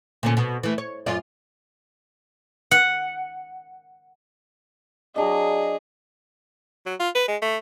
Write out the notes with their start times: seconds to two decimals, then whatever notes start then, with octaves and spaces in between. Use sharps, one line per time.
0.23 A#2 D3 C#4
0.37 B2
0.63 E3 A3
0.78 C#5
1.06 F#2 F4 D5
2.71 F#5
5.16 F#3 D4 G#4 D#5
6.86 F#3
7.00 F4
7.15 B4
7.28 G#3
7.42 A3